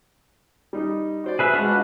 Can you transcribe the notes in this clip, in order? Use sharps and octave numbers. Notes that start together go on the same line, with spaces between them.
G3 D#4
F#4 C5 D5
G#4 B4 E5
G#3 D4 F#4 B4 F6
F4 D#5